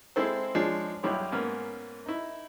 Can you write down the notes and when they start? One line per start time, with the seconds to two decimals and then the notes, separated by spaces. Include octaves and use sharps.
0.16 G#3 C4 E4 A4 C5
0.55 F3 G#3 D4 C#5
1.03 B1 G2 E4 G4 C#5 C6
1.32 G#2 A#3 B3 C#4
2.06 D#4 E4